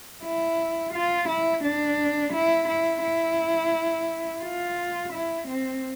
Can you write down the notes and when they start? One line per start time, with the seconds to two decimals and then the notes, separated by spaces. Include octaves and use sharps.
0.24 E4
0.94 F4
1.29 E4
1.64 D4
2.33 E4
2.68 E4
3.03 E4
4.43 F4
5.13 E4
5.48 C4